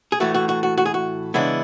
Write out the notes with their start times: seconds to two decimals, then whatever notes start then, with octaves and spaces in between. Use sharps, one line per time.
0.12 G#4
0.20 A2 E3 A3 F#4
0.34 F#4
0.49 F#4
0.63 F#4
0.78 F#4
0.86 G#4
0.94 F#4
1.34 C#3 E3 G#3 B3 D4 E4